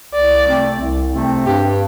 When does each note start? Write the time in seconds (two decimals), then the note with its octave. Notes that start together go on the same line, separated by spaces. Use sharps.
0.13 C2 D5
0.46 C3 A3 C4
0.80 C2
1.13 C3 A3 C4
1.46 G2 G4